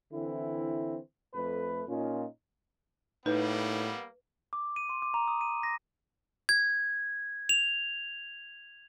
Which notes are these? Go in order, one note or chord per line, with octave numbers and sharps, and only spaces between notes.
D3 E3 C4 E4
F2 A3 B4
A#2 C#4 D#4 F4
A2 G3 A#3 B3 D#4 B4
D6
D#7
C6
D6
A#5
D#6
D#7
A#6
G#6
F7